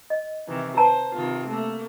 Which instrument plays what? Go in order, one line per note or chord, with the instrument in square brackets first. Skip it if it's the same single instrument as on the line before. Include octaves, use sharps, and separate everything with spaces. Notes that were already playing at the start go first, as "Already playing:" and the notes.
[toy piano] D#5
[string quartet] C3 D#3 E3
[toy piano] B4 A5 A#5 [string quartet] C5
[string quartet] C3 D#3 F4
A3 A#3